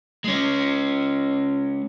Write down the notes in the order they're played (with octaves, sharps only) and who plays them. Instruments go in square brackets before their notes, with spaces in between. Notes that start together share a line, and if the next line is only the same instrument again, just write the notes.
[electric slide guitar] G#3 C#4